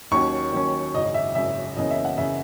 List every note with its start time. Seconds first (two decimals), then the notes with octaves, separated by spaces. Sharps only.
0.11 D#2 D#3 F#3 C#4 C#6
0.52 D#2 D#3 F#3 C#4
0.94 G#1 F#2 C#3 D#5
1.14 E5
1.35 G#1 F#2 C#3 E5
1.77 F#1 E2 C#3 D#5
1.91 E5
2.05 F#5
2.18 C#3 E5